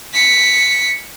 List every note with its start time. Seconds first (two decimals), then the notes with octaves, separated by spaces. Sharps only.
0.14 B6 C#7